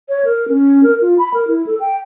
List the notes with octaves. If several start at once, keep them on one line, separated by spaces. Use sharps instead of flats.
C#5
A#4
C#4
A#4
F4
B5
A#4
E4
A4
G5